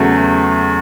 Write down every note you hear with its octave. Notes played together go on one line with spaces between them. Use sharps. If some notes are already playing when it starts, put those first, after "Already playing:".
Already playing: E2 C#3 F#3 A3